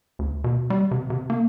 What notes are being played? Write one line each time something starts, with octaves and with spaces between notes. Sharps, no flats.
D2
B2
G3
C3
C3
A#3